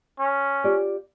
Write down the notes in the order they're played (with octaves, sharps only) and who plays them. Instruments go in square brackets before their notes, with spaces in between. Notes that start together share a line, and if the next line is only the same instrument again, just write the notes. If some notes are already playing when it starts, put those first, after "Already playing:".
[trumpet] C#4
[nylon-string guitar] F4 G4 D5